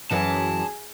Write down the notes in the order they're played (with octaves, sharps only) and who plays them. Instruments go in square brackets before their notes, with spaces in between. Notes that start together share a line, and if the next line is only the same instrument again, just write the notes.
[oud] F#2 E3 C#4 [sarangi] G#4 [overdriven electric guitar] A5